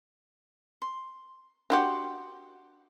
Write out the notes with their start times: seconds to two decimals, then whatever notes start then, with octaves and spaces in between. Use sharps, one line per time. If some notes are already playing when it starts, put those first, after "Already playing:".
0.82 C6
1.70 D4 F#4 G4 F#5 C6 D#6